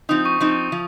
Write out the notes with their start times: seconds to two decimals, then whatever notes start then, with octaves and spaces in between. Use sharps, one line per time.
0.09 F3 C4 D#4 D#6
0.25 C#6
0.40 F3 C4 D#4
0.72 F3